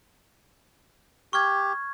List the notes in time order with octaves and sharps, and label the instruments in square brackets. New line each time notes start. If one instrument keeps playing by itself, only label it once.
[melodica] G4 [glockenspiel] C#6 F6 G#6